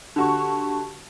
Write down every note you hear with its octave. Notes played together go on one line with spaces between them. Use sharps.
D3 F#4 G4 A5 C#6